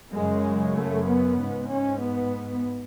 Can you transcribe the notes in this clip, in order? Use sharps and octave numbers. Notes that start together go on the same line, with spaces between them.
F#2 C#3 G#3
A3
B3
G#2
C#4
B3